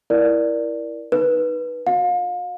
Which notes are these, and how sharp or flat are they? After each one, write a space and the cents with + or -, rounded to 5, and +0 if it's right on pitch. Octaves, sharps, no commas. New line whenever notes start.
E4 +0 A#4 +20 D5 +0
D#4 +0 B4 -15
F#4 -30 F5 +35